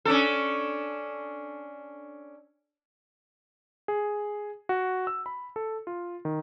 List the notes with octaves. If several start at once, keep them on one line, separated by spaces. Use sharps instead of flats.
C#4 D4 A4
G#4
F#4
E6
B5
A4
F4
D#3